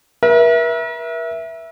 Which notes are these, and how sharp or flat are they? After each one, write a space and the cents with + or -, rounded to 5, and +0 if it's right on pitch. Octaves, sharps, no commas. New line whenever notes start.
A#4 +45 E5 +0